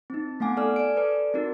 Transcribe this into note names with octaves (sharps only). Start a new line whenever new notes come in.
C4 D#4
A3 B3 F#5 G#5 D6
A4 D5 G#5 D6 F6
D5 D7
A4 B4 D5
C4 D#4 F#4 A#4